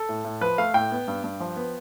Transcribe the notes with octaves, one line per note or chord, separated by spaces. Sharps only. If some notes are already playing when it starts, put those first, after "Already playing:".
Already playing: A4
A2
A2
F3 B4
A3 F5
A2 G5
B3
G2
G2
F3
B3